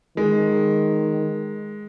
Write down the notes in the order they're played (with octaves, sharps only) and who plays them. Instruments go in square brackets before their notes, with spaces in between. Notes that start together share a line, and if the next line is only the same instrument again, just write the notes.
[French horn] D#3 [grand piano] G#3